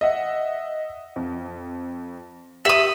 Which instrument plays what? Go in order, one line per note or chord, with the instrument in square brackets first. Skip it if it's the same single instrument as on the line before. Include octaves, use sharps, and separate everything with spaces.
[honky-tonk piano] D#5 E5 F#5
F2
[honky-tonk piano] G4 F#7 [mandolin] E5 D#6